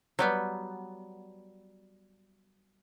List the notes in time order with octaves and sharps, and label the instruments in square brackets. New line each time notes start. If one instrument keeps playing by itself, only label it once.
[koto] F#3 G3 B3